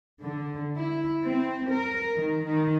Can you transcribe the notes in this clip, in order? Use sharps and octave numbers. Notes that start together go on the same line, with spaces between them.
D3
E4
C4
A#4
D#3
D#3